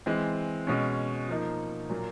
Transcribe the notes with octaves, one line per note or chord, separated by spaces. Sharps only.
E3 G#3 C4
B2 G#3 C#4
F3 A#3 D#4
A#2 F#3 A#3